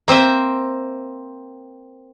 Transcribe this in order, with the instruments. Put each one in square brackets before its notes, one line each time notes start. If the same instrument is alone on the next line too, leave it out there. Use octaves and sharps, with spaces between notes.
[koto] A#3 C4 C5 E5